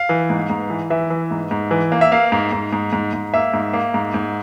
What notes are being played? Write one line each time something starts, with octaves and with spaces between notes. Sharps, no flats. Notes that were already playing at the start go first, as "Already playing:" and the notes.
Already playing: F5
E3
G#2
G#2
E3
E3 E5
E3
G#2
G#2
E3
A#3
E5
A#3 F5
G#2
G#2
G#2
G#2
G#2
A#3 E5
G#2
A#3
G#2
G#2